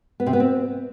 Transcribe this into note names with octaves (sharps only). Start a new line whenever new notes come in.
B3
C3
B3
C4